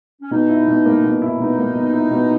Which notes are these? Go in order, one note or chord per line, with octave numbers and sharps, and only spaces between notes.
C#4
B2 D#4
E4
B2
A#3
B2
E4
B2 D#4
A#3
B2
E4
B2